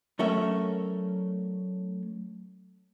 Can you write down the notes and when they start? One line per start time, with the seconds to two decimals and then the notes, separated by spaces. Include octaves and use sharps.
0.19 F#3 A3 C#4 A#4 E5